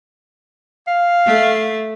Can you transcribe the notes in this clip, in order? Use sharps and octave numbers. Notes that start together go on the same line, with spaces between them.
F5
A3